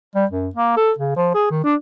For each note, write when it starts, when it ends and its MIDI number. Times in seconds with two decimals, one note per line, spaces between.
0.16 0.25 55
0.32 0.49 42
0.56 0.76 58
0.77 0.92 69
0.99 1.15 49
1.16 1.30 53
1.34 1.49 68
1.51 1.63 51
1.64 1.75 62